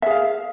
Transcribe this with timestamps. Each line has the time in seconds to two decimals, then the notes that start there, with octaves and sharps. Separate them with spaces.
0.02 E5
0.06 G#4
0.11 F5